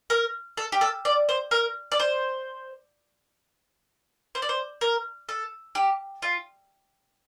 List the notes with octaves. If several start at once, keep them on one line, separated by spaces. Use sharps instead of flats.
A#4
A4
G4
A4
D5
C5
A#4
D5
C5
C5
D5
C5
A#4
A4
G4
F4